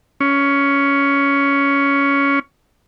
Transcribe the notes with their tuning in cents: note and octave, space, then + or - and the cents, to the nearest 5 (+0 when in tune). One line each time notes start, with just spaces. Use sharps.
C#4 +15